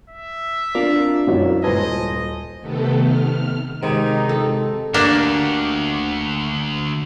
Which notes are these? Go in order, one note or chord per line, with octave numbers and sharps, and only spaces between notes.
E5
C4 D4 F4 A#4 D5
F#2 E4 F#4 C#5
D#1 B4 C5 D#5 G#5 A5
C3 D#3 A3 B3 A4
F6
G#2 C3 D#3 G#3 D#4
A4
D2 A#3 D4 G4